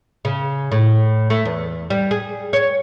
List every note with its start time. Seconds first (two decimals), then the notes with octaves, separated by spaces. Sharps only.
0.25 C#3
0.72 A2
1.30 A3
1.45 E2
1.90 G3
2.11 G#4
2.53 C#5